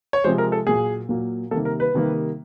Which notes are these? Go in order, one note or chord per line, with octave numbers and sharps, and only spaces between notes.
C#5
C3 F3 G#3 C5
A#4
A4
A#2 F#3 A#3 G#4
A#2 F#3 A#3
C3 D#3 G3 A#3 A4
A#4
B4
C3 D#3 G3 A#3